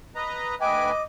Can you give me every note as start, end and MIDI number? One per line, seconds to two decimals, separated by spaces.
0.15 0.55 71
0.15 0.55 75
0.15 0.55 82
0.61 0.91 38
0.61 0.91 71
0.61 1.04 75
0.61 0.89 79
0.61 0.91 80
0.61 1.02 86